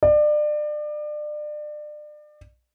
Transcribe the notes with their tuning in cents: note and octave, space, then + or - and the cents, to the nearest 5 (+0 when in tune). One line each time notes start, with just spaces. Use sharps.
D5 +30